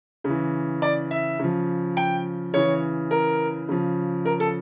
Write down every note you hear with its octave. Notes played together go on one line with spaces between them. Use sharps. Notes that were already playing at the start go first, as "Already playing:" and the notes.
C#3
E3
D5
E5
C#3 F3
G5
C#3 E3 C#5
A#4
C#3 F3
A#4
A4